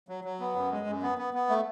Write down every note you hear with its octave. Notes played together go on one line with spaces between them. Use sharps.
F#3
F#3
B3
F#2
G#3
F#2
B3
B3
B3
A3